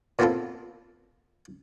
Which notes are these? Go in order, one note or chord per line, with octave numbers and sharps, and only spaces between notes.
A#2 B3 C4 E4 F4 A4